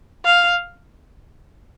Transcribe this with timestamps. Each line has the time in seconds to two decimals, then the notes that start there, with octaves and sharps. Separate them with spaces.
0.25 F5